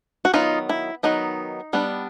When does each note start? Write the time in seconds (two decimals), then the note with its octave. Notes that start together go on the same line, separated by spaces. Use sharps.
0.25 F#4
0.33 D#3 F#3 B3 D#4 F4
0.69 E4
1.03 D#3 F#3 B3 D#4
1.73 G3 B3 D4